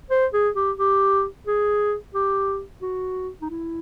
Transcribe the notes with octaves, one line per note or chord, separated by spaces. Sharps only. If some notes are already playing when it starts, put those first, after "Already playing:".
C5
G#4
G4
G4
G#4
G4
F#4
D#4
E4